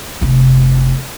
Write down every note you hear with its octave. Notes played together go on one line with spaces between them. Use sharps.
F1 C3